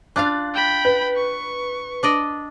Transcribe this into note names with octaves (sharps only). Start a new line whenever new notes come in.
D4 F4 F5 F#6 A6
G5 B5
B4
C#6
D4 D5 D#5